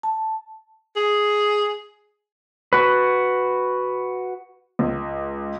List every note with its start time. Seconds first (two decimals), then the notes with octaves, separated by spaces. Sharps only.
0.03 A5
0.96 G#4
2.73 F#4 B4
4.79 C#2